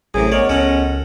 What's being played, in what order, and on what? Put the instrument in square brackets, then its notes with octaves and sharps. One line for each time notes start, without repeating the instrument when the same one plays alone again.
[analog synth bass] A1 [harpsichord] F#2 A2 C3 [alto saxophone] G#4
[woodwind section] G#3 B3 A#4 [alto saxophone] C#5 [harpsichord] D5
[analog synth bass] C#2 [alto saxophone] C#4 [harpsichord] A4 F#5